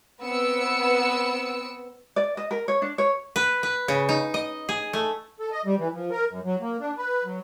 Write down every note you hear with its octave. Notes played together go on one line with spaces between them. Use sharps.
B3 C4 B4 E6 C#7
D5
D#5
A#4
C#5
D4
C#5
B4
B4
C#3
D#4
D#5
G#4
A3
A4
D#5
G3
E3
F3
A#4
F#2
F#3
A#3
D4
B4
F#3